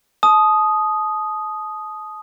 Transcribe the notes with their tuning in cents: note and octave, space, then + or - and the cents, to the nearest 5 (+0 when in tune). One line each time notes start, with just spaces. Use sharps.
A5 -35 D#6 +0